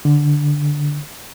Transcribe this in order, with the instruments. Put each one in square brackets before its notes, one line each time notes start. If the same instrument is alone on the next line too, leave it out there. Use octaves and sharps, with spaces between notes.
[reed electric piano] D3